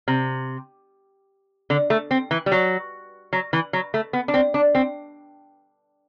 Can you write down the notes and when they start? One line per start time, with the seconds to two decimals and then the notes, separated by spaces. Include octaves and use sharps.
0.08 C3
1.70 D3
1.90 A3
2.11 C4
2.31 E3
2.46 G3
2.52 F#3
3.33 F#3
3.53 E3
3.73 F#3
3.94 A3
4.13 B3
4.28 D4
4.34 C4
4.54 D4
4.75 C4